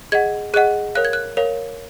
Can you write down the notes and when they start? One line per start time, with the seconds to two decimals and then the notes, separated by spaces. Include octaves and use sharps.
0.12 G#4 D#5 F#5 G#6
0.54 G#4 D#5 F#5 F#6
0.95 A#4 C#5 F5 F#6
1.05 G#6
1.13 F#6
1.37 A#4 C#5 F5